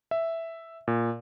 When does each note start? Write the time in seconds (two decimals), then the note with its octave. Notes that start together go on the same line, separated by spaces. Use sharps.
0.11 E5
0.88 A#2